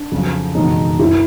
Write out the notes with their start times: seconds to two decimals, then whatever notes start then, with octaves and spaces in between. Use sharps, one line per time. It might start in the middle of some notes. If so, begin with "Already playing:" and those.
Already playing: D4
0.12 F2 C#3 F#3
0.55 F#1 E2 B2 G#3 D#4
0.99 F#2 D3 E4